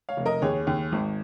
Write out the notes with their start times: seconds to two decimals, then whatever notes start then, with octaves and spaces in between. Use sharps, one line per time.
0.09 C#5 F5
0.17 F1
0.26 A#4 D#5
0.42 D#2 G#4 C#5
0.67 D#2
0.92 G#1